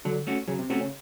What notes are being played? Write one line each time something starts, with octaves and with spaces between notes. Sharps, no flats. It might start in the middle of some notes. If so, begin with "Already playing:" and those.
D3 F#3
A3 C#4 F#4
C#3 F#3
C3
C3 A3 C#4 F#4
C#3